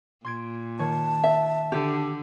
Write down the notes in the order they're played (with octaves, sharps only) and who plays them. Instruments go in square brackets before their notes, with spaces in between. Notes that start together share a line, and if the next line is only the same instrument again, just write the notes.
[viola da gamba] A#2 [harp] C6 G#6 D7
[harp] D#3 [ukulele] C#5 [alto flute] A5
[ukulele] E5
[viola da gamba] D3 [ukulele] G4